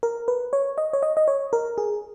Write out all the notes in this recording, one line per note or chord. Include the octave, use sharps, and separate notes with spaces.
A#4
B4
C#5
D#5
C#5
D#5
D#5
C#5
A#4
G#4